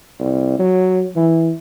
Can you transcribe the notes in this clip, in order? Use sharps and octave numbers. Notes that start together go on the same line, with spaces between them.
C2
F#3
E3